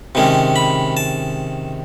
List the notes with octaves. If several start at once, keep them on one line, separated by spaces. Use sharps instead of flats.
C3 D#3 G#3 C#4
B5
A5